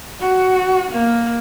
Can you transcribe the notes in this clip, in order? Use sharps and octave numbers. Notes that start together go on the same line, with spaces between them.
F#4
A#3